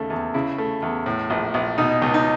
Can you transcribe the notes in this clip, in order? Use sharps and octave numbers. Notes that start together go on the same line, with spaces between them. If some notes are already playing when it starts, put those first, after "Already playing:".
Already playing: D#2 C#3 A3
E2
C#3 E4
A3
E2
A2
A#1
A#1
B2 D#4
C#2
D#4